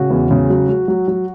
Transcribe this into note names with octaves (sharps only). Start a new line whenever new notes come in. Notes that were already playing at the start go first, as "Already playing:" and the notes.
Already playing: C#3 F#4
E2
C#3
F#3
F#3
F#3
F#3